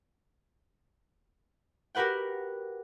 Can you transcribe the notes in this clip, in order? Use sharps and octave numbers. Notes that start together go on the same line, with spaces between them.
F#4 G4 A#4 B4 F#5 G5